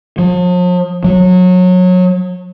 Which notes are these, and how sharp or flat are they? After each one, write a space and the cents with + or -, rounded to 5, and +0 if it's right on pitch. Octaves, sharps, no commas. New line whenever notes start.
F3 +45
F#3 -25